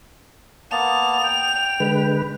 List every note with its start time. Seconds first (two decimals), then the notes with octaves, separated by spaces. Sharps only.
0.71 A#3 B3 A5 F7
1.23 G5
1.80 D3 G#3 B4